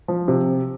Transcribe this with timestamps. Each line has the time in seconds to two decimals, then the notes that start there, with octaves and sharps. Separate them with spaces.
0.08 F3
0.28 C3